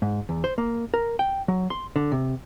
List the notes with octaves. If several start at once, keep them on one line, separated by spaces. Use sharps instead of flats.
G#2
E2
C5
A#3
A#4
G5
F#3
C6
D3
C3